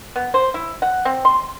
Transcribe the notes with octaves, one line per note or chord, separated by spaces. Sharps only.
B3
C5
E4
F#5
C4
C6